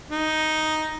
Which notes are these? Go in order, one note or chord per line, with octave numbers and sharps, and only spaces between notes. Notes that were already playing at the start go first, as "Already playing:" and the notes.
D#4